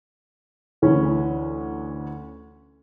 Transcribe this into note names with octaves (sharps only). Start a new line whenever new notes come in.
D2 E3 C#4